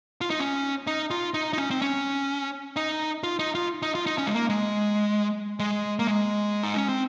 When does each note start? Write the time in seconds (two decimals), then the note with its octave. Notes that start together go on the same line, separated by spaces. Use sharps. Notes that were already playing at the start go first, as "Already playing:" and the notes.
0.21 F4
0.30 D#4
0.40 C#4
0.87 D#4
1.11 F4
1.34 D#4
1.53 D#4
1.58 C#4
1.70 C4
1.82 C#4
2.76 D#4
3.24 F4
3.39 D#4
3.55 F4
3.82 D#4
3.95 F4
4.06 D#4
4.18 C#4
4.26 G#3
4.34 A#3
4.49 G#3
5.60 G#3
5.99 A#3
6.07 G#3
6.63 D#4
6.77 C#4
6.89 C4